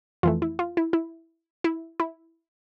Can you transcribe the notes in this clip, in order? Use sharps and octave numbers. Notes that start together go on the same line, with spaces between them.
F2 E3 A3 F4
E4
F4
E4
E4
E4
E4